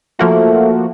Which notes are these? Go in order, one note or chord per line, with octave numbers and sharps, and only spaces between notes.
F3 A3 A#3 F#4